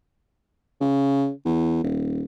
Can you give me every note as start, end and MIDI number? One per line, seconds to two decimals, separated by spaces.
0.81 1.30 49
1.45 1.79 40
1.83 2.23 27